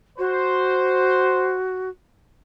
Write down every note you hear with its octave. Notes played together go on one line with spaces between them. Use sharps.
F#4 C5